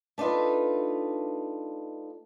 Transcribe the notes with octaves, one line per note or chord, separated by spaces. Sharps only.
A3 D4 D#4 F4 B4